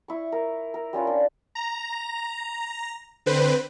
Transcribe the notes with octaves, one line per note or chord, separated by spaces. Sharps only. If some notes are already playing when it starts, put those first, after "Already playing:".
E4 C#6
A#4
A#4
G3 C#4 F4 B4
D4
A#5
D3 C4 B4 C5